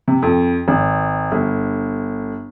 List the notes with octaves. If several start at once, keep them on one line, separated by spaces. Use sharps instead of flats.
C3
F2
G#1
G1